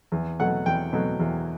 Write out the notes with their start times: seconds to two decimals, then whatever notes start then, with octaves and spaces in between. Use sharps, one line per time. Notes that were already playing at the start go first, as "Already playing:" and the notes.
0.12 E2
0.40 B2 F#3 A3 F#5
0.66 E2 G5
0.93 B2 F#3 A3
1.20 E2